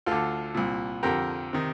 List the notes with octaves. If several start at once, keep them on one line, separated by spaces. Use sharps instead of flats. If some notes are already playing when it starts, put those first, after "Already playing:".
D2 D3 F4 A4
C2 A#2
F2 D3 G4 A#4
C3 D#3